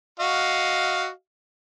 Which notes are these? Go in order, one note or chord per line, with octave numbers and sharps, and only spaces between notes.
F#4 D#5 F5